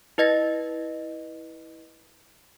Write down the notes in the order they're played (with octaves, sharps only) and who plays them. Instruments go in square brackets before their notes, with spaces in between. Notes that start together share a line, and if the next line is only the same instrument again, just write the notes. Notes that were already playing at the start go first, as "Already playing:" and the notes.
[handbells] E4 B4 D#5 A6 A#6